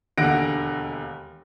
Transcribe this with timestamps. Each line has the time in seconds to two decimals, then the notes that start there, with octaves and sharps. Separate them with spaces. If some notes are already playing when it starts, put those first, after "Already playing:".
0.18 E1 D#2 D3 F#5 A#6 D7